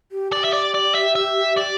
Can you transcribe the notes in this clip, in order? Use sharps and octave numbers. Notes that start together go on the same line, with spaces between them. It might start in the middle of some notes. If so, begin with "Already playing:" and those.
G4
G4 D5
E5
D5
D5
E5
E5
D5